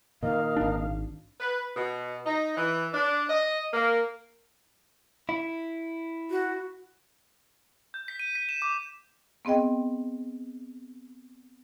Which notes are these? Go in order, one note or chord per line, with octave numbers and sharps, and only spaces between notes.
A#2 D#3 A#4 D#5 F5
G#1 D4
B4
B2
D#4
E3
D4
D#5
A#3
E4
F#4
G6
B6
D#7
B6
E7
D6
B3 C4 G#4 D#5 G5